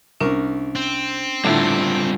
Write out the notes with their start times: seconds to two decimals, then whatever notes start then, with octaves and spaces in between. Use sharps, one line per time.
0.21 C2 C#4 D4 A#4
0.76 C4
1.44 A2 D3 G3 D4 F4 E5